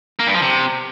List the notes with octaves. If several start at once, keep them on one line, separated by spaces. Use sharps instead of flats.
A#3
G2
F3
C3